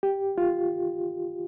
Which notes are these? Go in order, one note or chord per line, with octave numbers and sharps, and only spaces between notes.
G4
F4